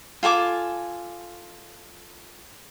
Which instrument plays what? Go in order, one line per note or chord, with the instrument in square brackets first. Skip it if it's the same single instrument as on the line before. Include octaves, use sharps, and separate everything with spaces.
[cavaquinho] F4 A4 G#5 D6